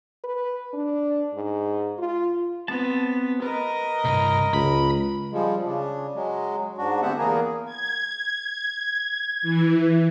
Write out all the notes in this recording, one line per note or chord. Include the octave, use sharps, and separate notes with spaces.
B4
D4
G#2
F4
B3 C4 A5
A#4 B4 D#5
C2 G2
C#2 B5
F3 G3 G#3
C#3 D4
F#3 G#3
G#2 D4 F#4
D2 B3 C4 G4 E5 F#5
E2 A#3 B3 G#4 A#4
G#6
E3